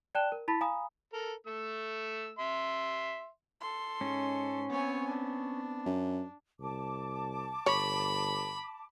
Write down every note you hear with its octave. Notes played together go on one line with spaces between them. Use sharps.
D5 G5 A5 F#6 E7 G7
A#4
E4 A5 B5 A6 B6
F5 G#5 A#5 B5 D#6
A4 A#4
A3 E6
E5 C6
A4 C6
G#2 C#4
B3 C4 C#5 G#5
D4
F#2
C2 A5 D6
G1 C#5 B5